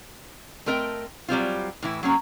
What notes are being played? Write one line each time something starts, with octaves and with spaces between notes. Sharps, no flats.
A3 C4 A#4 D#5 E5 G5
F#3 G3 C4 F4
A2 E3 E4
F#3 A#3 C#4